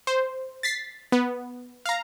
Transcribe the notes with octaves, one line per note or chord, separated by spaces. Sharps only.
C5
A6 B6 C7
B3
F5 A#5